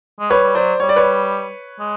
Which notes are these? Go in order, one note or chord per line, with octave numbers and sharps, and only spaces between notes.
G#3
G3 B4 C#5
G3
F#3 C5 D5
G3 C#5
D5
B4 C#5
G#3